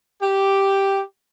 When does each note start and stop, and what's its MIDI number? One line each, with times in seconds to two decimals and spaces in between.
0.22 1.02 67